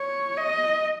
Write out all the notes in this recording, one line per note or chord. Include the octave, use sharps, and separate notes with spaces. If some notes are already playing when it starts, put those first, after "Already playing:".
Already playing: C#5
D#5